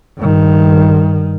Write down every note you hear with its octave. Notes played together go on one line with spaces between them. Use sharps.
G2 D#3